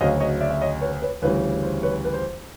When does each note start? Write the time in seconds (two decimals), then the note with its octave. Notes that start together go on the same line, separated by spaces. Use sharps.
0.01 D2 C#3 F#3 D#5 F5
0.20 C#5 D#5
0.41 D5 E5
0.51 E5
0.61 C#5 D#5
0.81 B4 C#5
1.02 B4 C#5
1.22 D2 C#3 E3 G3 B4
1.63 C5
1.83 B4 C#5
2.05 B4
2.14 C5